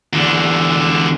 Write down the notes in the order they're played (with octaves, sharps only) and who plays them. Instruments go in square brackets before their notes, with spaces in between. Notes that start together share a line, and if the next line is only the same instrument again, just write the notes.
[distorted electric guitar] E2 D3